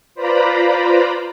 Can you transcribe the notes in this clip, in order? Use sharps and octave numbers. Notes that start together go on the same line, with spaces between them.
F4 B4 C5 D5 A#5 B5